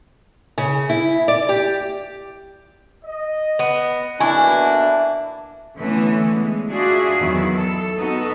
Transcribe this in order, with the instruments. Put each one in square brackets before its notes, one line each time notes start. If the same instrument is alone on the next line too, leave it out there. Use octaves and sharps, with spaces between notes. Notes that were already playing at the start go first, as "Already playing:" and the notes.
[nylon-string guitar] C#3
E4
D5
G4
[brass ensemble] D#5
[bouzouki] B3
[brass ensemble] B2 D3 A#3 [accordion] D4 [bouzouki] E4 [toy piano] G#5 C#6
[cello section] D3 E3 A3 B3 C#4
G#3
D4 F4 F#4 G#4 D5 E5
E2 D#3 F#3 B3 E4
A4
B3 D#4 F#4 A4 D#5